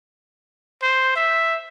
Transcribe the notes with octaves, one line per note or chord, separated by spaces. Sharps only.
C5
E5